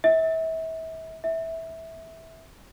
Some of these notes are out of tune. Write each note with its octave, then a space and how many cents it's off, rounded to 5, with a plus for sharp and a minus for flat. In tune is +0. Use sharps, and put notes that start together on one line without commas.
E5 -35
E5 -15